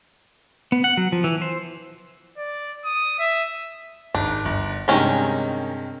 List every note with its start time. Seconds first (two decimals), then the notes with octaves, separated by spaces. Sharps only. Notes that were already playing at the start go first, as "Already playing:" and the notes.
0.72 B3
0.84 F#5
0.97 F#3
1.12 F3
1.24 E3
1.42 C5
2.38 D5
2.85 D#6
3.19 E5
4.15 G#1 G#2 D4
4.45 G1
4.88 G2 C3 D#3 G#3 C#4 D#4